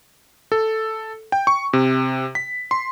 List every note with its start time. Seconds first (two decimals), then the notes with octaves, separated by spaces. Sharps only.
0.52 A4
1.32 G5
1.47 C#6
1.73 C3
2.35 B6
2.71 C6